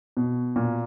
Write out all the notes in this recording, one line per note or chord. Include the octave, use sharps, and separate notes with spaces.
B2
A#2